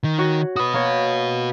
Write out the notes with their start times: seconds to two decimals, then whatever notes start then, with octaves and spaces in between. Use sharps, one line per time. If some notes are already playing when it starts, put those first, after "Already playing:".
0.04 D#3
0.18 F#4 C#5
0.56 F#4 B4 D#6
0.73 A#3 C#5